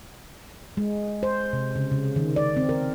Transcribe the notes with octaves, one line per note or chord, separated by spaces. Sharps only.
G#3
C5
C3
C#3
C#3
D#3
D5
C4
A#4